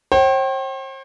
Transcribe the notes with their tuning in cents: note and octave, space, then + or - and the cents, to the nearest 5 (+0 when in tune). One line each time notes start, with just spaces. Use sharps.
C5 +45 G5 -30